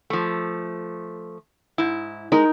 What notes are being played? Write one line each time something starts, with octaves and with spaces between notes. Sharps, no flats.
F3 A3
G#2 E4
G#3 D#4 A#4